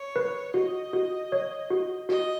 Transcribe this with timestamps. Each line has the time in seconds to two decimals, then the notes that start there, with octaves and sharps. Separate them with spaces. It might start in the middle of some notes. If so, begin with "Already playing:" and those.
Already playing: C#5
0.16 B4
0.54 F#4 D#5
0.93 F#4
1.32 C#5
1.70 F#4
2.09 F#4 D#5